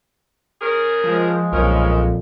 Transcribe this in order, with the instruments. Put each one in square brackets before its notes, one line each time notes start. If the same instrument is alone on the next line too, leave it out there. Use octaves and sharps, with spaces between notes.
[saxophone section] C#3 G#4 A#4
[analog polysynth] F3 [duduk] G#3
[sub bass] B1 [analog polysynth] F2 A#2 [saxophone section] C#3 A#4